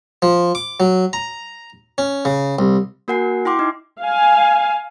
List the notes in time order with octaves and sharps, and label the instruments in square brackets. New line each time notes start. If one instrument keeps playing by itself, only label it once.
[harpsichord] F3
D6
F#3
A#5
C#4
C#3
C2
[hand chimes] A#3 F#4 A#4 F#5 G#5 C7
E4 G5 C6 D6
D#4
[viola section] F5 G#5